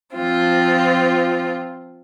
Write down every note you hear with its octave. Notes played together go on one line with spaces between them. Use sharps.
F3 C4 F4